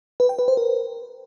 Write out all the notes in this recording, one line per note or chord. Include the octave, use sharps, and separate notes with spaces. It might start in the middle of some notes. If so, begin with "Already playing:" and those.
B4
G5
B4
C5
A#4